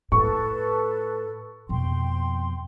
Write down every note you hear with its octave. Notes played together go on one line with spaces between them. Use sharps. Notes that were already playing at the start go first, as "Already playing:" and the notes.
A2 A4 B4 C#6
F2 B2 G5 C6